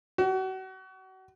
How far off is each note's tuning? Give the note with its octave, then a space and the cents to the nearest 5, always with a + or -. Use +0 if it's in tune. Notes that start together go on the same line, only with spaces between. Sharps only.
F#4 +35